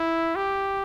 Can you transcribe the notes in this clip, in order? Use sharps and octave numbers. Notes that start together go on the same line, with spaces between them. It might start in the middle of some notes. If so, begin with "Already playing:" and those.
Already playing: E4
G4